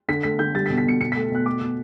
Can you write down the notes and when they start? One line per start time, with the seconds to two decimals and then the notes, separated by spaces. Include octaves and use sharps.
0.08 D3 B6
0.23 A3 B6
0.39 D3 G6
0.55 G3 A6
0.66 B6
0.70 B2
0.78 B6
0.85 B2 C#7
1.00 B2 C#7
1.12 A3 B6
1.31 B2 F#6
1.46 A3 D6
1.61 B2